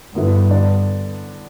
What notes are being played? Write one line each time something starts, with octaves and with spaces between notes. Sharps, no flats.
G2 D3 B3 E4 B4
D3 B3 D4 A4 D5